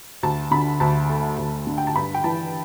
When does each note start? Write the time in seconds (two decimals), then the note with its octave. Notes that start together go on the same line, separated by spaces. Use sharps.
0.23 D2 A5
0.51 D3 B5
0.80 D2 A5
1.09 A3
1.38 D2
1.67 D3
1.78 G5
1.87 A5
1.95 G2 B5
2.14 G5
2.24 E3 A5